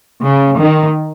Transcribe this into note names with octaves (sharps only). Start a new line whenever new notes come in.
C#3
D#3